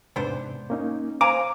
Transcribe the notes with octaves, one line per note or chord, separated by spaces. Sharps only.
E2 G#2 C3 B3 D4 C5
A#3 C#4 D#4
C5 F5 G#5 A#5 D6